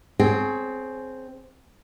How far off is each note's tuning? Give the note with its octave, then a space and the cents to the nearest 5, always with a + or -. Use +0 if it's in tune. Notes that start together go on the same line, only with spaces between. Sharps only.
C4 +0 G#4 +25 C#5 +0